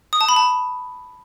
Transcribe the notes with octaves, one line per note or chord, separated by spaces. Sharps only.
D#6
A5
B5
A5